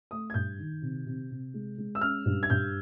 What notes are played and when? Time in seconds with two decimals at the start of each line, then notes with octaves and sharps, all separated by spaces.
0.11 A3 D#6
0.30 G#6
0.34 G2 G6
0.58 D#3
0.82 C3
1.06 C3
1.31 C3
1.54 G#3
1.78 G#3
1.95 E6
2.01 C#4 F6
2.25 G2
2.43 G#6
2.50 G2 G6